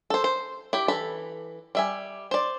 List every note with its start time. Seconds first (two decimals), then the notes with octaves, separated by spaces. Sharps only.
0.10 A4 C5
0.24 C5
0.73 E4 G4
0.88 E3 A4 B5
1.75 G3 E5 G#5
2.31 C5 D5